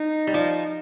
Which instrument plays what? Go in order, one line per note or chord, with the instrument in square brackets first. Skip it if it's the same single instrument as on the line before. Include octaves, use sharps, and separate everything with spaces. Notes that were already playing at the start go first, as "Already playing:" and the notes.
Already playing: [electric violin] D#4
[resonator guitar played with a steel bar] G3
F3